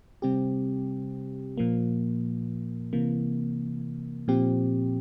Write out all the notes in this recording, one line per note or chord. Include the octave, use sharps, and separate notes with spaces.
C3 G3 C4 G4
A#2 F3 A#3
C3 E3 A#3
A#2 F3 C4 G4